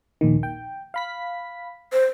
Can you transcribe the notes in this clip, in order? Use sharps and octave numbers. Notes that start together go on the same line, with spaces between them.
A#1 D#2 D#3
G5
F5 B5 B6
C5